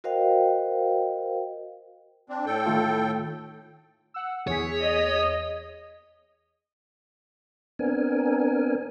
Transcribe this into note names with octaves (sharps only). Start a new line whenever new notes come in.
F#4 A#4 C5 D#5 F5 G5
C4 D4
A2 A4 G5
D#3 A3 F4
F#5 E6
E2 G#4 C#5 B6
D#5
B3 C4 D4 A#4 G#5